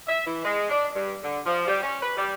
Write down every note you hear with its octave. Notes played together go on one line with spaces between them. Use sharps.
E5
E3
G#3
D4
G2
D3
F3
G3
C#4
B4
G3